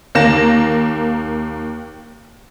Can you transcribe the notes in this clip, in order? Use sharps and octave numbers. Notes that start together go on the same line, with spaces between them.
D#2 A#3 A#6 E7